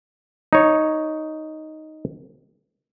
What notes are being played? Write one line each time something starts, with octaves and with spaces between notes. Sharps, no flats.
D#4 C#5